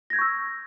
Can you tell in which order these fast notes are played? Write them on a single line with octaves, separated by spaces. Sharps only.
A#6 G#6 G6 C#6 E6